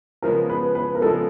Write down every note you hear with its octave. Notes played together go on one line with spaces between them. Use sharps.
C#3 F3 G#3 B3 A#4
B4
B4
A#4
C#3 F3 G#3 B3 A4